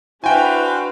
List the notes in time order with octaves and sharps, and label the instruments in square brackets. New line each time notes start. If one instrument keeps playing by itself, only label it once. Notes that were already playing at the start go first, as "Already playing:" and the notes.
[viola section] D4 B4 F5 [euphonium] E4 [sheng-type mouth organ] F#4 C5 [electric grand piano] G5 G#5